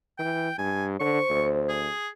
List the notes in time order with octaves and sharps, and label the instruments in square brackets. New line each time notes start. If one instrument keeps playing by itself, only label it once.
[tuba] E3 [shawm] G5
[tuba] G2 [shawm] G#5
[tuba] D3 [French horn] C5 [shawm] C#6
[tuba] D2
[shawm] G#4